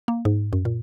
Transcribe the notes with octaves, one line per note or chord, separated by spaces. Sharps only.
A#3
G#2
F#2
A#2